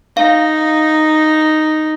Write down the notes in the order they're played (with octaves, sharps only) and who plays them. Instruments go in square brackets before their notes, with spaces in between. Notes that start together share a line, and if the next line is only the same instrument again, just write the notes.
[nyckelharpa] D#4 [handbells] F5